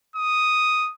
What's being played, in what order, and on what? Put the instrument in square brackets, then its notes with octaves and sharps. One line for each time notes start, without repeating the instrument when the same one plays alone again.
[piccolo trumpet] D#6